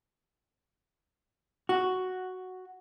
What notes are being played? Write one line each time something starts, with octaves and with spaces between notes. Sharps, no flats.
F#4